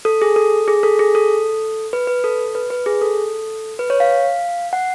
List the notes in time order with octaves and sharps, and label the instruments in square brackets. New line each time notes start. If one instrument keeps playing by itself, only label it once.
[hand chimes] A4
G#4
A4
G#4
A4
G#4
A4
B4
B4
A4
B4
B4
G#4
A4
B4
C#5
F5
F#5